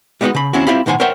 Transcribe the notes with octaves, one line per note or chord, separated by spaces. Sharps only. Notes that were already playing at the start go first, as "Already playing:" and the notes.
G3 G#3 B3 C#4 D#4 F#4
C#3 B5
D#2 C4 C#4 E4 F#4
C4 E4 F4 G4 F5 B5
B1 A2 D#3 C5 F#5 G#5
A#4 C5 C#5 E5 F#5 G5